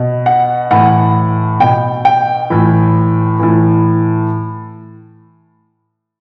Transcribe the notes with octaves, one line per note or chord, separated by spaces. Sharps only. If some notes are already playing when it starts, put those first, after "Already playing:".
Already playing: B2
F#5
A2 E3 F#5
B2 G5
G5
A2 E3
A2 E3